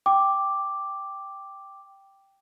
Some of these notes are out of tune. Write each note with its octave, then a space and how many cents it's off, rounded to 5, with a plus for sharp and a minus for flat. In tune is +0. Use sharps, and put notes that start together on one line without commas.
G5 +0 D6 +0